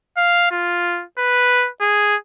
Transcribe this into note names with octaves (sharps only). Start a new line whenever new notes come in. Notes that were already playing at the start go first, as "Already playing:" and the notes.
F5
F4
B4
G#4